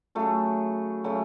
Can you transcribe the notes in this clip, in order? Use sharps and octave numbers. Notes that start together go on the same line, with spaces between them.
C#3 F#3 A3
C#3 F#3 A3